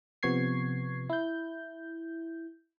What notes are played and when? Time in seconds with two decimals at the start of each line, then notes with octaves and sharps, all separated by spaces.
0.23 C3 F3 B3 C#6 G#6 C7
1.10 E4 G6